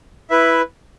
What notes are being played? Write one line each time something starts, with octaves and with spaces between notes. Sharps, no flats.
E4 B4 E5